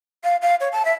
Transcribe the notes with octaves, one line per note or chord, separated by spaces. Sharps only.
F5
F5
C#5
A5
E5